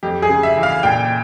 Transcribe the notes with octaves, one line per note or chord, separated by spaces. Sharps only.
F2 G4
G#4
C#3
E5
E3
F5
A#2 G5